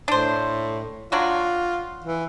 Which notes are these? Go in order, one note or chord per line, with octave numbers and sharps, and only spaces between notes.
A2 D4 C5
F#3 D4 F4 F#4
E3